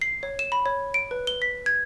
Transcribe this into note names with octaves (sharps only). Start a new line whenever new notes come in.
C7
C#5
E7
B5
C#5
D7
B4
G7
B6
G#6